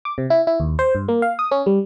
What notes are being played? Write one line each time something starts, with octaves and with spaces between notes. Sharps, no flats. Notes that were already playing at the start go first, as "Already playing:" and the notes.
D6
C3
E4
E4
D#2
C5
G2
A#3
F5
D#6
C#4
G3